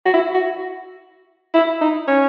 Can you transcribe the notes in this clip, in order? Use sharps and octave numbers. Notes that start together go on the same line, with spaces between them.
F#4
E4
F#4
E4
D#4
C#4